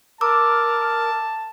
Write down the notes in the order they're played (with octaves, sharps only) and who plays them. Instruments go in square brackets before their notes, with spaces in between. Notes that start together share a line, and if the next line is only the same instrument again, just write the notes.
[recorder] A#4 [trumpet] A5 [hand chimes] A#5 D6 E6